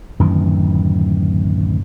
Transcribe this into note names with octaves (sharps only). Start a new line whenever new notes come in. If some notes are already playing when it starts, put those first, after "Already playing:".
D1 F#2 D#3 E3